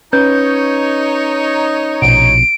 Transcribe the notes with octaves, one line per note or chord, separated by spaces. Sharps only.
C#4 D#4 B4 C#5 G6
A#1 B2 D7